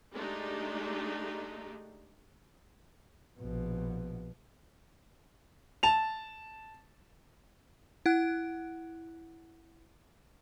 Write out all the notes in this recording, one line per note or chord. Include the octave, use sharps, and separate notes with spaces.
G#3 A3 D4 D#4 G4
A#1 B2
A5 F7
E4 F#5 F#6